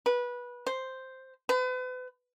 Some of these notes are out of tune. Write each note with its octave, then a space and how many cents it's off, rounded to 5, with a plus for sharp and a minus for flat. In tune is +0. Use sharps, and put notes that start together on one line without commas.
B4 -20
C5 +0
B4 +40